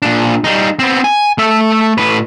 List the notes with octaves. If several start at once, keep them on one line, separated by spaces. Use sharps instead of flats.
A#2 D4
G3 D#4
B3 C4
G#5
A3 E5
A2 B4